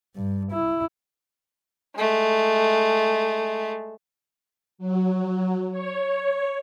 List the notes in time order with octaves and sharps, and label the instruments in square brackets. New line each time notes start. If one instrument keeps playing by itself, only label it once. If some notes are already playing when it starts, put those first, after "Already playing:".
[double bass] G2
E4
[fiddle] G#3 A3
[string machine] F#3
C#5